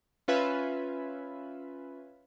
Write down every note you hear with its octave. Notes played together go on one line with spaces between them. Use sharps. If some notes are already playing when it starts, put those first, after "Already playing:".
C#4 F4 B4 E5 G#5 B5